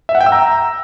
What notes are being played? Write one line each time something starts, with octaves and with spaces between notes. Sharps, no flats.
E5
F#5
G5
E6
A#5